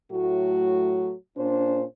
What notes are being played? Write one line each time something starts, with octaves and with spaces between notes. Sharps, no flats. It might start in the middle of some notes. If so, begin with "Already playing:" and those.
A2 F#3 A3 F#4
A#2 C#4 D4 C5